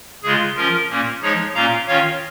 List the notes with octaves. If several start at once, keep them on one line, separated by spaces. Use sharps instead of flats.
C#3 G#3 F4 G#4
F3 C#4 F4 A#4
A#2 A#3 C#4
F3 G#3 D#4 G#4 C#5
A#2 A#3 C#4 F4 F5 A#5
D#3 C#4 F4 C#5 F5